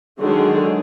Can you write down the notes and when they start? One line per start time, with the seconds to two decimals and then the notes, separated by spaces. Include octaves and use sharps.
0.19 D3 D#3 F#3 G#3 G#4 A4